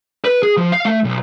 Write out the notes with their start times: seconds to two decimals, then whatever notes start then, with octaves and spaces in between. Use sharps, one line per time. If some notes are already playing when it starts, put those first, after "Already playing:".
0.25 B4
0.43 G#4
0.57 F3
0.72 F5
0.85 A3
1.04 B1